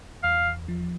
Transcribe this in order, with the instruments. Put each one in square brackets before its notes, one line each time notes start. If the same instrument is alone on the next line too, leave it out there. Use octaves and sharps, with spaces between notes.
[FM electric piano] E2 [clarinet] F5
[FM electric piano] F3